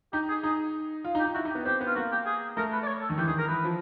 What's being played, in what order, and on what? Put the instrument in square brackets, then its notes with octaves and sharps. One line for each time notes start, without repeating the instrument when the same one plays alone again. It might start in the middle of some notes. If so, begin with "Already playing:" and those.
[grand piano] D#4 [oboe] G4
[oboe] G#4
[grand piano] D#4 [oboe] G#4
[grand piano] F4
D#4
[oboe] G4
[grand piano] D#4
[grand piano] E4 [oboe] F#4
[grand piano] D#4
[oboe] G4
[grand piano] B3
[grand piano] C4 [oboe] G4
[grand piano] B3
[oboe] F4
[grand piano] A#3 [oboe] F#4
[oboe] G4
G#4
[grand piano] A3 [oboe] A#4
[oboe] B4
D5
C#5
A4
[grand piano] D#3
[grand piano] E3 [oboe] G4
[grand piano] D#3 [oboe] G#4
[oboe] A#4
[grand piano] E3 [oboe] B4
[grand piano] F3